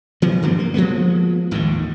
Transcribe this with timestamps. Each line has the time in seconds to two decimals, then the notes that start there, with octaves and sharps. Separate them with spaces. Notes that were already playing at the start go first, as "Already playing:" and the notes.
0.22 E3 F#3 B3
0.42 G2 D3 F3 G3
0.59 A#3
0.74 F3 G#3 A#3 B3
1.51 G#1 D#2 A2 D#3